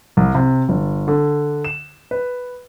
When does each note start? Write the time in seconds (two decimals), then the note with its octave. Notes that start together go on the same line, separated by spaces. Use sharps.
0.17 C2
0.35 C3
0.69 G1
1.08 D3
1.65 E7
2.11 B4